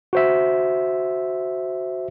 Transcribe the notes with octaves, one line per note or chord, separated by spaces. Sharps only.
F#4 C5 E5